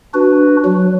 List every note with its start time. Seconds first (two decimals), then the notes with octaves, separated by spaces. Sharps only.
0.14 D4 F#4 B4
0.65 F#3